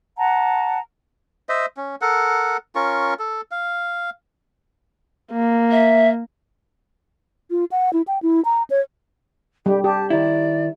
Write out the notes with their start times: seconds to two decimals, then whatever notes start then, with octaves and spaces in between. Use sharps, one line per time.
0.17 F#5 A5 A#5
1.49 C5 D#5 E5
1.77 C#4
2.02 A4 A#4 F#5
2.75 C#4 F4 A#4 C#6
3.19 A4
3.51 F5
5.33 A#3
5.71 E5
7.50 F4
7.72 F#5
7.93 E4
8.08 G5
8.23 E4
8.45 A#5
8.70 C#5
9.66 G3 G4
9.84 G4 A5
10.10 D#3 E4 D5